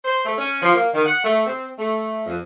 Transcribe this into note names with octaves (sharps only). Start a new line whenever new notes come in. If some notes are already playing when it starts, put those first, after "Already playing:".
C5
A3
C#4
F3
A#3
D#3
F#5
A3
C4
A3
F2